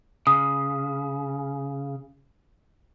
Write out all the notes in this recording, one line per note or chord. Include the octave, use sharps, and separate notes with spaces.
C#3 D#6